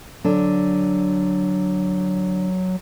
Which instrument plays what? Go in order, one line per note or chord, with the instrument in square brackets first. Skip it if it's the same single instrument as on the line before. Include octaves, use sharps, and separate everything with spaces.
[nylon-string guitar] D3 [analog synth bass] F#3